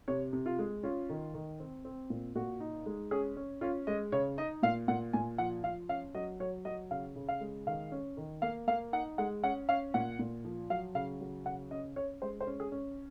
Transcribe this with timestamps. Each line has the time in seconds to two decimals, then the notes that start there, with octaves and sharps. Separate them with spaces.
0.08 C3 C#5
0.33 C3
0.46 F4
0.59 G#3
0.83 C#4 F4
1.09 D#3
1.34 D#3
1.60 C4
1.85 C4
2.10 A#2
2.35 A#2 F#4
2.60 D#4
2.86 G#3
3.11 C#4 G#4
3.36 C#4
3.61 C#4 F4
3.87 G#3 D#5
4.12 C#3 C#5
4.38 D#4 D#5
4.63 A#2 F5
4.88 A#2 F#5
5.13 A#2 G#5
5.38 F3 F#5
5.64 F3 F5
5.89 C#4 F5
6.15 F#3 D#5
6.40 F#3 C#5
6.65 F#3 D#5
6.91 C#3 F5
7.16 C#3
7.29 F5
7.41 G#3
7.67 D#3 F5
7.92 C#4
8.17 D#3
8.42 A#3 F5
8.68 A#3 F5
8.93 D#4 F#5
9.18 G#3 F#5
9.43 C#4 F#5
9.69 C#4 F5
9.94 A#2 F#5
10.19 A#2
10.44 F3
10.70 F#3 F5
10.95 C#3 F5
11.21 F#3
11.46 C#3 F#5
11.71 C#4 D#5
11.96 C#4 C#5
12.22 G#3 C5
12.40 C5
12.47 C#4
12.60 G#4
12.72 C#4